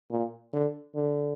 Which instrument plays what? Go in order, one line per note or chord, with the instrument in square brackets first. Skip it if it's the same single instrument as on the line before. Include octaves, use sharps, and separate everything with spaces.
[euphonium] A#2
D3
D3